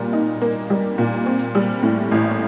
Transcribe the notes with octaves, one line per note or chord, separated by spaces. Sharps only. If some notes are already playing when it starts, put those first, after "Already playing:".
Already playing: A#2 G3 A#3
D#4
A#3
G3
A#2
C4
G3
A2
A1